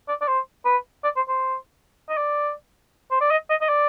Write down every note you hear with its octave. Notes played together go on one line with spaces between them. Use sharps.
D5
D5
C5
B4
D5
C5
C5
D#5
D5
C5
D5
D#5
D#5
D#5
D5